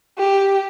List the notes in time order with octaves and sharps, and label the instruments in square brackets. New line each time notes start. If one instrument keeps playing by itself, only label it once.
[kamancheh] G4